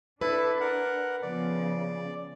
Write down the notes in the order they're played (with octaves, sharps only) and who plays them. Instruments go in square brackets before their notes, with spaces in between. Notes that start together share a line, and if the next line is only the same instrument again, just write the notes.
[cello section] D4 [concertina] E4 A4 [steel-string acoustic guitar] B4
[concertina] A#4 F#5
[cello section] C#3 F3 B3 [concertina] D5